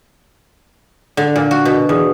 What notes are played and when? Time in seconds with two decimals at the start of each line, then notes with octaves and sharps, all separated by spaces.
1.17 D3
1.36 A#2
1.51 F#4
1.65 B2
1.89 E2